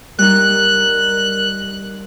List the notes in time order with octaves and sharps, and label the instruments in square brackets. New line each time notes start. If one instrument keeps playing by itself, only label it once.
[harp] G3 D#4 [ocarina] A#4 [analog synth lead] F#6